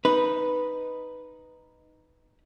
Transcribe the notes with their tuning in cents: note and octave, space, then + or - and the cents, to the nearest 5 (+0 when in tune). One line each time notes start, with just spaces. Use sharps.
D#4 +0 B4 +0